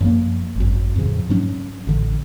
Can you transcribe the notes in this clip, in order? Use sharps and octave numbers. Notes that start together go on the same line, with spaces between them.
F#2 F3 A#3
G#1 F#2
F2 A2 C#3 F3
G#2 F#3 C#4
A1 D3